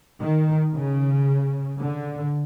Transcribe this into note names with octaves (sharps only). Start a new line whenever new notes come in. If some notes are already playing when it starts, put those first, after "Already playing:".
D#3
C#3
D3